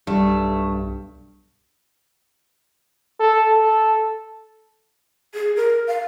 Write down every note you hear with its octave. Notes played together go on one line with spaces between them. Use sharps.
B1 G2 G3 A3
A4
A4
G#4
A#4
F5